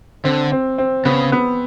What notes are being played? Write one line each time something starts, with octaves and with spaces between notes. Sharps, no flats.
D3 C4
C4
C4
C#3 B3
B3